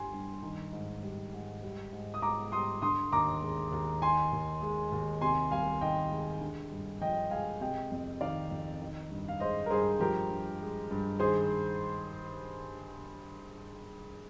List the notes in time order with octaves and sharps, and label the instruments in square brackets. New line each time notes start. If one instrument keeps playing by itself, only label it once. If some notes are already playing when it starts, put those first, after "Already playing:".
Already playing: [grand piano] G2 D3 G3 G#5 C6
G2
D#3
G#2
G3
G#2
G3
G#2
D#6
G#2 A#5 D6
G3 C6 D#6
D3 C6 D#6
D#2 A#5 D6
G#3
D#2
D#3 G#5 C6
D#2
G#3
D#2
C3 G#5 C6
C2 F5 G#5
D#3 D#5 G5
G#3
D3
G2
F3 D#5 G5
G#3 F5 G#5
C3 D#5 G5
F2
D#3 D5 F5
F2
D#3
G2
F5
G#3 C5 D#5
A#4
G2 G#4 C5
F3 G4 A#4
G2
G#3
G2
D#3 G#4 C5